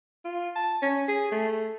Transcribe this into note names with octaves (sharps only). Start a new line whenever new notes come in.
F4
A5
C#4
G#4
A3